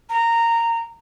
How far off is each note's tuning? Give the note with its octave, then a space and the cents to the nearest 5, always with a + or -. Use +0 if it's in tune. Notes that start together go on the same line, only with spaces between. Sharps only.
A#5 -15